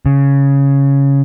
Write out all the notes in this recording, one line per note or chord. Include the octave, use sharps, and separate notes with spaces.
C#3